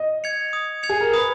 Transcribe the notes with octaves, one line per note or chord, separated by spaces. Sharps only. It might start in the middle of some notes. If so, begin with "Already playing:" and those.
Already playing: D#5
G#6 C#7 F7
D#6
G#6 C#7 F7
G#4
A#4
B4 D#6